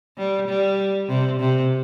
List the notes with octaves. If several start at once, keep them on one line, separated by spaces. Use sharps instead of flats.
G3
G3
C3
C3